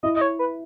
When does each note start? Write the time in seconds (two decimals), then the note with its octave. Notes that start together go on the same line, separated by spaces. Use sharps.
0.03 E4 D#5
0.16 D#5
0.21 C#5
0.39 B4